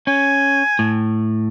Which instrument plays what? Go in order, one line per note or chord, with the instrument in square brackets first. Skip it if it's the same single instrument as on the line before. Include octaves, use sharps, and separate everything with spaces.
[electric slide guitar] C#4 [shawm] G#5
[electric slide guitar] A2